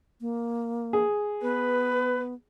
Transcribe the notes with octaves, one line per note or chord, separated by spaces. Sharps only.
A#3
G#4
B3 B4